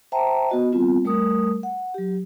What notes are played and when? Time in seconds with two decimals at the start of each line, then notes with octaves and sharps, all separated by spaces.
0.12 C5 E5 G5 A5 A#5
0.50 B3 F#4 D#5
0.72 G3 B3 C4 F4
1.05 G3 A3 A#4 D#6
1.63 F#5
1.94 F#3 G4